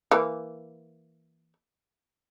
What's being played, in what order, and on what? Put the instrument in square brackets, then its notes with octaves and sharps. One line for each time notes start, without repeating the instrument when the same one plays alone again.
[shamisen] E3 A#3